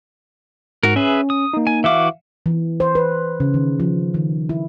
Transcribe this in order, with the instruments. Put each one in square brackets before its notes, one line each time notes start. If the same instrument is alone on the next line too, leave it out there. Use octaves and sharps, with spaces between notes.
[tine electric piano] G#2 [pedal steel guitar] F#4 A#4
[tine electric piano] C#4 [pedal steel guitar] G#4 B4 E5
[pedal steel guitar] D#6
[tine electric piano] A#3 D#4
[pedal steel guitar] G#5
[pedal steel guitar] E3 F#4 D6 [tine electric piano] E5 F5
[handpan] E3
C5
B4
C#3
D#3
F3
D#3
E4